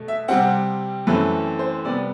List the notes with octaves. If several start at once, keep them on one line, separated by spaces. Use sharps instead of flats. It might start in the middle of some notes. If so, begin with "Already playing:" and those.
Already playing: B2 A3
E5
C3 G3 C4 F#5
F#2 E3 A3 C4 B4
C5
C3 G3 B3 D5